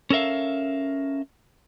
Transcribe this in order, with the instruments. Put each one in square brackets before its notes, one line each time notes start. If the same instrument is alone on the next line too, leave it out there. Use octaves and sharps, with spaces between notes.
[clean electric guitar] C#4 A4 A#4 E5 F5